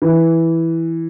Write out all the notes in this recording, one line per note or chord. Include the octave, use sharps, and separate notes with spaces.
E3